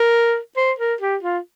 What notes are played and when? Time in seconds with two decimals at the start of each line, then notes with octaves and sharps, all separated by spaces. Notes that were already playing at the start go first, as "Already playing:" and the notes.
Already playing: A#4
0.57 C5
0.79 A#4
1.01 G4
1.23 F4